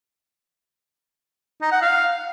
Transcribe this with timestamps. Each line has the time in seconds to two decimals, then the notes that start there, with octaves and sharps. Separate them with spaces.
1.62 D#4
1.72 F#5
1.82 F5